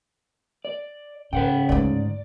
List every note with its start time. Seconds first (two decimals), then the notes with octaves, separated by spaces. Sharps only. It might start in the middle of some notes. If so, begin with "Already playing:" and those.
0.65 D5
1.33 G#2 C#3 B4 F#5 G5
1.69 D2 G#2 D5